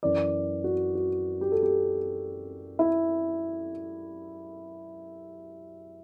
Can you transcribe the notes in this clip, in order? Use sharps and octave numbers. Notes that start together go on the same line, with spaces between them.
F#2 E3 D5
F#4
F#4
G4
A4
G4
E4